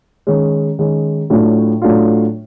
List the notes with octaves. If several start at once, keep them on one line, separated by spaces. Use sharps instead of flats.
D#3 G#3 C#4
D#3 G#3 C#4
A2 F#3 A3 D4 F4
A2 F#3 A3 D4 F4